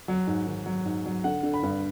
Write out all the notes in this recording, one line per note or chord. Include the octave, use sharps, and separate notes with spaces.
F#3
G#2
D#3
F#3
G#2
F#3
D3 F#5
D3
B5
G2